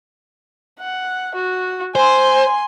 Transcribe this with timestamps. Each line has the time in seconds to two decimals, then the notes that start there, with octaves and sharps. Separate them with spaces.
0.79 F#5
1.35 F#4
1.95 C5 G#5 C6